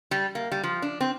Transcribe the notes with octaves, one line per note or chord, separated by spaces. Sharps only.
G3
A#3
G3
F3
D4
C4